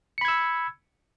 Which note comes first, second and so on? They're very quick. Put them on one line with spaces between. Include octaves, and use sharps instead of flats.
C#7 B5 G#6 E6